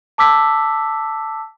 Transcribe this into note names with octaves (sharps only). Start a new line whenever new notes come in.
A5 D6 E6 B6